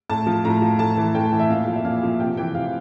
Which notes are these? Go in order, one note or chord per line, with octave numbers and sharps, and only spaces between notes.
A2 A5
F3
A2 A#5
F3
A2 A5
E3
A2 G5
E3
E5
A#2 F5
F3
E5
A#2 F5
F3
C3 G5
E3 G5
C3 F5